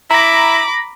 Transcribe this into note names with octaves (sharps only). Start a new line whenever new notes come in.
E4 A#5 B5 D6 A#6